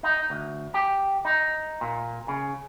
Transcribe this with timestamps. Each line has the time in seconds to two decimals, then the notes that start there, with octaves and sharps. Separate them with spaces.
0.03 D#4
0.30 D2
0.74 G4
1.25 D#4
1.81 A#2
2.28 C#3